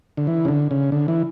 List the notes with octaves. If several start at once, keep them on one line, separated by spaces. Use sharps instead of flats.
D3
E3
C#3
D3
C#3
D3
E3